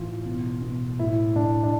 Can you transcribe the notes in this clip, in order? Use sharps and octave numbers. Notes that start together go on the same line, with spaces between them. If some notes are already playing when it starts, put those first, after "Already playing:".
Already playing: A2 E3 F4
B2
B2
A2 E4
A2 D4
D4